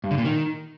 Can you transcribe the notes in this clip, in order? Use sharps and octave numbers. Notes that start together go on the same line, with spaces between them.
G2
D3
A#2
D#3